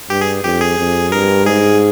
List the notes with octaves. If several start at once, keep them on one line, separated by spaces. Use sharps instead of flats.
G2 G4
G#4
F2 G4
G#4
F2
G2 A#4
G#2 G#4